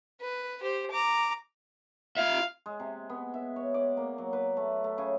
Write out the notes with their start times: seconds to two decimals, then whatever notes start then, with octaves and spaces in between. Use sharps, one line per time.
0.21 B4
0.61 G4 C5
0.91 A#5 D6
2.17 F4 E5 F5
2.66 G#3
2.80 C3
3.09 B3
3.34 E5
3.56 C#5
3.74 D5
3.97 A#3
4.18 F#3
4.33 B4
4.57 A3
4.84 A3
4.98 C#3